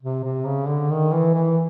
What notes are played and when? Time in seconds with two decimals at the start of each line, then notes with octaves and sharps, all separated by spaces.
0.03 C3
0.24 C3
0.46 C#3
0.68 D3
0.90 D#3
1.12 E3
1.34 E3